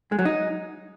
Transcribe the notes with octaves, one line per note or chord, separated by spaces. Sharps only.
G#3
F#3
D#4